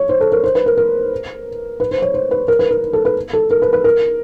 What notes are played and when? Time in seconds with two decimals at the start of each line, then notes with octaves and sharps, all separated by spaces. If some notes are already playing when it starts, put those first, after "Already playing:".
Already playing: C#5
0.09 C5
0.21 A4
0.32 A#4
0.44 C5
0.55 B4
0.66 A#4
0.77 A#4
1.80 B4
1.91 C5
2.02 C#5
2.14 C5
2.31 B4
2.48 A#4
2.59 B4
2.71 A#4
2.93 A4
3.05 B4
3.33 A4
3.51 A#4
3.62 B4
3.73 B4
3.84 A#4